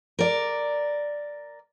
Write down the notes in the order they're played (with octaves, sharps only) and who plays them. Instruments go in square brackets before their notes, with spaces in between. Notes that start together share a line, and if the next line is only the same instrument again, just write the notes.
[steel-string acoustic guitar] A#4 D5